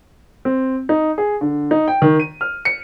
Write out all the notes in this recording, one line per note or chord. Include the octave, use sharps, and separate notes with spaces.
C4
D#4
G#4
D3
D#4
G5
D#3
D#7
F6
C#7